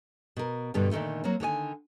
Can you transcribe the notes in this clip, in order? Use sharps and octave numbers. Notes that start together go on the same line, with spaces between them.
B2 A#4
G2 B2 D3 G3
A#2 D3 D#3 F#3 A3
F#3 A#3 C4
D3 D#3 C#5 G#5